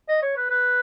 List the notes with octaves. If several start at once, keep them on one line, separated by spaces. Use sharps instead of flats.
D#5
C#5
B4
B4